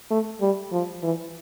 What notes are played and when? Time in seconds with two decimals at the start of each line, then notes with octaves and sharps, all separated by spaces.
0.11 A3
0.41 G3
0.72 F3
1.03 E3